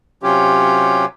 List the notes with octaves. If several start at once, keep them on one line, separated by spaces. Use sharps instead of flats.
C3 F#3 C#4 F4 G4